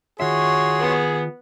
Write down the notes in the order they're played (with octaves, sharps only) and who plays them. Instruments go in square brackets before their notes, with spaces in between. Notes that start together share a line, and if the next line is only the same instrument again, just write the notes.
[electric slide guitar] D#3 F4 E5 [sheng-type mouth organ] F#4 C#5 C6 [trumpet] G#4
[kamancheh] B3